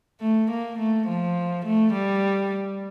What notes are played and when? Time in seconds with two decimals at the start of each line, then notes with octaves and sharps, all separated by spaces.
0.21 A3
0.51 A#3
0.79 A3
1.07 F3
1.65 A3
1.93 G3